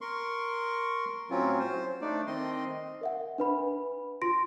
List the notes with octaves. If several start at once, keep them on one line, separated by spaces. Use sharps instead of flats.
A#4 C6 C#6
A2 F#3 C4 C#4 F4
C5
A3 D4 D#4 D5
D#3 C4 D#5 C6
A#4 E5 F#5
D4 B4 B5
F4 C6 A#6 D7